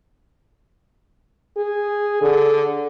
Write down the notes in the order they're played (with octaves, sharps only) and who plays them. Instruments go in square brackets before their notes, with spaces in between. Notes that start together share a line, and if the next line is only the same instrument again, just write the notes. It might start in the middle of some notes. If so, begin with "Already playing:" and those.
[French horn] G#4
D3